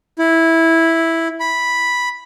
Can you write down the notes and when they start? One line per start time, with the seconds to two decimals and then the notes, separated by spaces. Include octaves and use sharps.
0.19 E4
1.40 B5